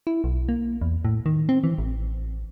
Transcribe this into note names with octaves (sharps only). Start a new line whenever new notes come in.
E4
B1
A#3
E2
A2
D#3
C4
E3
A1